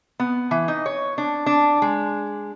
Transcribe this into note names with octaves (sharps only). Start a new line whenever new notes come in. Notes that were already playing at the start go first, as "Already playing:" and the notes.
B3
E3
D#4
C#5
D4
D4
G#3